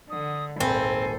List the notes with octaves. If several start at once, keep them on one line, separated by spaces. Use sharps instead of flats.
D3 D#6
D#1 G#1 C4 A4 C5 G#5 B5